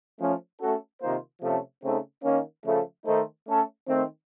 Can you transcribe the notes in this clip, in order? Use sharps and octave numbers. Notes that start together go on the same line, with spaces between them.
F3 A3 C#4
A3 C#4 F#4 A4
C3 D#3 A#3 F4 C5
C3 F3 A3 C#4 A4
C#3 A3 C4 D#4 A4
D#3 A#3 C#4
C#3 F3 A3
D#3 A3 D#4 A4 C5
A3 C#4 A4
D#3 A3 C4